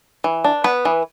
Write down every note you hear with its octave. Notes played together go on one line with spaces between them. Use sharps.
E3
D4
B3 B4
E3